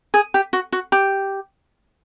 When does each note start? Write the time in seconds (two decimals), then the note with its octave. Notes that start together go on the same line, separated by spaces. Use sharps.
0.14 G#4
0.34 G4
0.53 F#4
0.72 F#4
0.92 G4